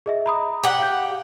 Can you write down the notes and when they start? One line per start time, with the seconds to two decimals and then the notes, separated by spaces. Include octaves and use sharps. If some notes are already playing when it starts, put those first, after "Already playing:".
0.06 G#4 D#5 E5
0.26 A#5 B5 D#6
0.64 G4 F#5
0.79 F5 G6